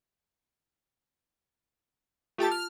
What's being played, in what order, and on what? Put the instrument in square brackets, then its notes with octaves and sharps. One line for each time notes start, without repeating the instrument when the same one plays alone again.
[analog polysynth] A3 G4 A6 [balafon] F4 A5
[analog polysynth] F6